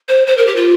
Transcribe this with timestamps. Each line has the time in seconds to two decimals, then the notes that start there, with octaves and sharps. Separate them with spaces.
0.08 C5
0.27 C5
0.37 A#4
0.47 G4
0.56 F4